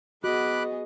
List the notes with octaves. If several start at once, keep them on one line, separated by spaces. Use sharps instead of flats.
B3 F#4 G#4 D#5 B5 D6 F#6